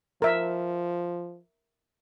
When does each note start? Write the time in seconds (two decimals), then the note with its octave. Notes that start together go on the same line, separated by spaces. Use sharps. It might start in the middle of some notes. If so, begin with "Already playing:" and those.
0.22 F3 A#4 E5